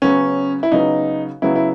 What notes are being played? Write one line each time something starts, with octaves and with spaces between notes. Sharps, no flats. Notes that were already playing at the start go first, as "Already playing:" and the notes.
C#3 F#3 B3 C#4
E4
C#3 F#3 B3 D#4
C#3 F#3 B3 E4
E4